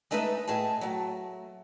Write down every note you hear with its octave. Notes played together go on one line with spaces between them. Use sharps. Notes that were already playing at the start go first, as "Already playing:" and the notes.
G#3 A3 D#4 B4 D#5 E5
A2 G#4 D#5 A5
F#3 A3